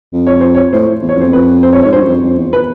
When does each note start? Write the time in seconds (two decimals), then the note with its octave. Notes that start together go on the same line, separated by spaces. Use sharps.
0.13 F2
0.27 C#5
0.41 C5
0.55 C#5
0.73 A2 C5
1.02 E2
1.09 C#5
1.18 F2 C5
1.33 B4
1.63 C5
1.73 C#5
1.83 G#2 C#5
1.92 G2 C5
2.00 F#2
2.08 F2
2.23 F2
2.38 E2
2.53 B4